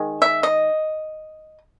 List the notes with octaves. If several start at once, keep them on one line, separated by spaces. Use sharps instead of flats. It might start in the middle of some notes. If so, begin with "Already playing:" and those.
Already playing: D#3 G#3
E5
D#5